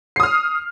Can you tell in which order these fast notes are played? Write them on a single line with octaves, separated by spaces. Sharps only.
C7 D#6 F6